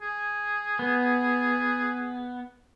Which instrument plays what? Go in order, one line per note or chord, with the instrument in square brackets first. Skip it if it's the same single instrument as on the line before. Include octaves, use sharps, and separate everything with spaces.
[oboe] G#4
[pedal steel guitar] B3